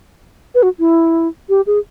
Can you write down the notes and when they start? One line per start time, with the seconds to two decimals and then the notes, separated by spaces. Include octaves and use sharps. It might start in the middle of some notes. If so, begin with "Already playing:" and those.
0.55 B4
0.63 F#4
0.79 E4
1.49 G4
1.67 G#4